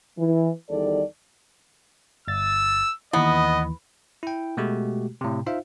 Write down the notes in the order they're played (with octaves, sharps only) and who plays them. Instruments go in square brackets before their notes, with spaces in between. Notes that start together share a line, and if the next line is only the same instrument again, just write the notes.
[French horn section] E3
E2 D#3 G3 A4 D5
[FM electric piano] G1 A6 [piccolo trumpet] E6
[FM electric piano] D#2 E3 [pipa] B3 [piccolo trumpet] D#5
[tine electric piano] E4 G5
B2 G#3 A3 F#4 G4
A2 C3
D#4 F4 C5 E5 F5